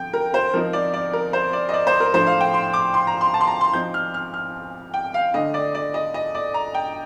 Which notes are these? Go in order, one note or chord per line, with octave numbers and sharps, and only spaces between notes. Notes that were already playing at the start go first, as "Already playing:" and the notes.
Already playing: D3 F3 C4 G5
A#4
C5
F3 C4 D#4 A#4
D5
D5
A#4
C5
D5
D#5
D5
C5
A#4
A2 F3 A3 D4 C5
F5
G5
C6
D6
C6
A#5
C6
A5
C6
A#5
C6
F3 C4 D#4 G6
F6
F6
F6
G5
F5
D3 A3 D4 D#5
D5
D5
D#5
D#5
D5
A#5
G5